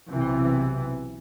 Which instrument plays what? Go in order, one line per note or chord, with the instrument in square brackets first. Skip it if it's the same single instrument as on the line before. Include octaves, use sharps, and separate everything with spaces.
[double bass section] B1 C3 E3